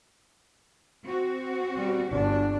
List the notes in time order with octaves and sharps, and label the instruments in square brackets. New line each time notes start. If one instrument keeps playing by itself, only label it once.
[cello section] C4 F#4
[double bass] G3
G1 D4